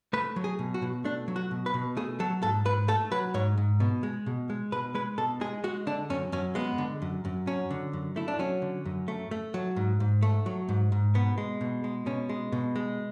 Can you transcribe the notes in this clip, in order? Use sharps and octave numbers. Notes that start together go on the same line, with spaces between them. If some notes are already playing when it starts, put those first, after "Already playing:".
A3 B4
F#3
G#4
B2
F#4
B2
A3 D4
F#3
F#4
B2
B4
B2
A3 G#4
F#3 A4
G#2 A4
G#2 B4
A3 A4
F#3 B4
G#2 C#5
G#2
B2
G#3
B2
G#3
B2 B4
G#3 B4
B2 A4
G#3 G#4
G#3 F#4
D3 D4
F#2 C#4
F#2 C#4
G#3 B3
D3
F#2
F#2
F#3 C#4
D3
F#2
A3 E4
D4
F#3 C#4
D3
F#2
A3
A3
F#3
G#2
G#2
A3
F#3
G#2
G#2
B2 B3
G#3
B2
G#3
B2 C#4
G#3
B2
G#3